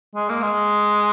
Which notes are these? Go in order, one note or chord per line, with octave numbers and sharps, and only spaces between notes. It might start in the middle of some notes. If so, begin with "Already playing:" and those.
G#3
A#3
G#3